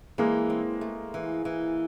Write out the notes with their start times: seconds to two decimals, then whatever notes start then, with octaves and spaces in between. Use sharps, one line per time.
0.18 E3 G#3 A#3
0.50 C4
0.81 A3
1.14 E3
1.45 E3